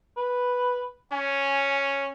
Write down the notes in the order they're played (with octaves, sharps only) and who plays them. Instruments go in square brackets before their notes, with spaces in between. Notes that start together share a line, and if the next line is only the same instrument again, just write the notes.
[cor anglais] B4
[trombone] C#4 [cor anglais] G#5